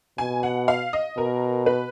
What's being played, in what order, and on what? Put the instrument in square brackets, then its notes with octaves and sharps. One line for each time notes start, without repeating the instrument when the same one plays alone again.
[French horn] B2 [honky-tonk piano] G#5
[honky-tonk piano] F#5
F5
D#5
[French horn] B2 [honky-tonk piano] A#4
[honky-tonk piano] B4